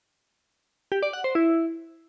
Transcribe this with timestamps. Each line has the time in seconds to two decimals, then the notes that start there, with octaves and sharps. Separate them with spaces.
0.92 G4
1.03 D5
1.13 F#5
1.24 C5
1.35 E4